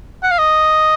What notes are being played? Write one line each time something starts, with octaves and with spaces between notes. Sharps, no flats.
F#5
F5
D#5